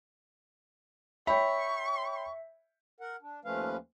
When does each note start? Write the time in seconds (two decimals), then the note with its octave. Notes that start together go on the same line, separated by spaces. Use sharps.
1.27 C#5 E5 G5 B5 C#6
3.00 A#4 F#5
3.22 D4
3.45 D#2 F3 A3 C#4 B4 F5